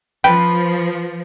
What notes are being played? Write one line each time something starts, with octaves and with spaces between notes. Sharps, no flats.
F3 B4 G5